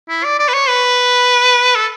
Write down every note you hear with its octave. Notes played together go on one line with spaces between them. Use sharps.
E4
D5
D5
B4
C#5
B4
A4